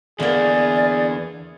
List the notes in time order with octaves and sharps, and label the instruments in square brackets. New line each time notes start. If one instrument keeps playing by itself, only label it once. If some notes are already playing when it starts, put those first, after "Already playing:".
[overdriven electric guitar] E2 B3 [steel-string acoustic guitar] D3 A#3 [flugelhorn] G#4 [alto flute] D5